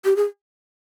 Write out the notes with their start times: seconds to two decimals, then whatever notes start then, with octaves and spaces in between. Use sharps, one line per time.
0.05 G4
0.16 G#4